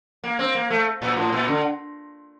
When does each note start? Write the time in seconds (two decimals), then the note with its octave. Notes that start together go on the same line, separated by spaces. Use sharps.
0.24 A#3
0.39 C4
0.55 A#3
0.70 A3
1.02 A#2
1.16 A2
1.32 A#2
1.48 D3